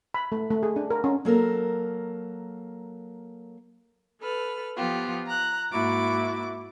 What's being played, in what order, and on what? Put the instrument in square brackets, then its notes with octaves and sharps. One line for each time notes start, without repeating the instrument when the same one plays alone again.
[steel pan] B5
A3
A3
G#4
D4
A#4
C#4
[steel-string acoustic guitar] F#3 A#3 A4 A#4
[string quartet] A4 B4 F6
F3 B3 F4 G4
A#5 F#6
G#2 A#3 E4 F#4 D6 A6